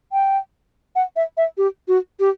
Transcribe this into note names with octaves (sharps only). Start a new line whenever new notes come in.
G5
F#5
E5
E5
G4
F#4
G4